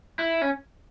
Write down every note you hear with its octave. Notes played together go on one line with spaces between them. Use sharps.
E4
C#4